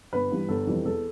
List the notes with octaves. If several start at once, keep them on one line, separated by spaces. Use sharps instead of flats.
G1 B4
G2 E3 G3
G1 A4
F2 E3 G3
E2 A4